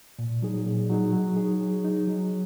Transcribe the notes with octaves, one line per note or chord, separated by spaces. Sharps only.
A#2
F#3 D#4 G#4
A#2
F#3 D#4 G#4
F#3
D#4 G#4
F#3
D#4 G#4
F#3